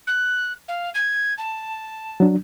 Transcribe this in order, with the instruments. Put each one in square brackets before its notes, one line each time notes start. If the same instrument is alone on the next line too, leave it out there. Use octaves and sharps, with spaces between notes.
[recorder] F#6
F5
G#6
A5
[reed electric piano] F#3 D4